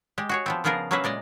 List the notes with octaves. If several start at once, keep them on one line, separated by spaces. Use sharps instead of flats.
G#3 G4
F#4 G#4 C#5
F3 B3 C4
C#3 F3 B3 F4 G#4 A#4
F#3 A#3 C#4 G#4 B4 E5
A#2 G#3 D5 D#5